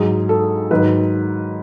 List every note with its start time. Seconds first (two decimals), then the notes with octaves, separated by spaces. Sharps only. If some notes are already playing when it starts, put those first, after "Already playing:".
Already playing: G#2 F#3 G#4
0.29 A4
0.71 G#2 D#3 F#3 B4